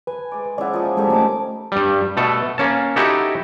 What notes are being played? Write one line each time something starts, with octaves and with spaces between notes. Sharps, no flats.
B4 G#5
G#3 D5
F3 G#3 C#4 E4 D5 F#5
F3 A#3 G#4
G#3 C4 C#4 D#4 G4 A4
E3 A3 A#3 C#4 D#4 D6
G2 G3
B2 A3 A4
A#3 C#4 A5
D#4 E4 F#4 G4 A4